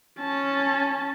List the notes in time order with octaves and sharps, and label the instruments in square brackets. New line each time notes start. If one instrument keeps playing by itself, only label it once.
[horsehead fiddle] C#4 A5